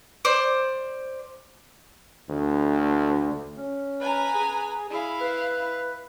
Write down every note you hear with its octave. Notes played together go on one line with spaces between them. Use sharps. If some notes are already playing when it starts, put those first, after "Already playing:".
C5 D5
D2
C#4
B4 G#5 A#5
G#4
E4 G#4 F5
B4